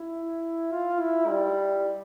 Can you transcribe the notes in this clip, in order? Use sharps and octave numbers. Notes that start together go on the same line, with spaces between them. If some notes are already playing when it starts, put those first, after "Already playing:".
Already playing: E4
F4
E4
G3